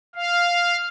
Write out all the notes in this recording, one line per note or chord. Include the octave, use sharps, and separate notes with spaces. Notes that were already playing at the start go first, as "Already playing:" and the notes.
F5